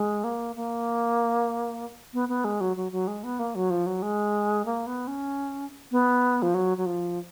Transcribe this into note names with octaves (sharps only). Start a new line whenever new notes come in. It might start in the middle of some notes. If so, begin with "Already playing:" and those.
Already playing: G#3
A#3
A#3
B3
B3
G#3
F#3
F#3
F#3
G#3
B3
A#3
F#3
F3
F#3
G#3
A#3
B3
C#4
B3
F3
F#3
F#3
F3